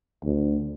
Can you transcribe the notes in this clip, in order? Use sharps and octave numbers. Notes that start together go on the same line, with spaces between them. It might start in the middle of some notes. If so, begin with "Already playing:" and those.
D2